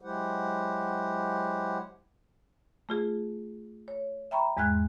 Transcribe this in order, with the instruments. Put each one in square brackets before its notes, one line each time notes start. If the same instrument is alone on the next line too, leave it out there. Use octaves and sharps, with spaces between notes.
[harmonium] F#3 G#3 E4 G4 C5 F#5
[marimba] A3 F4 G#4
C#5
E5 G5 A#5 B5 C#6
E2 G#2 G#3 F6 F#6 G#6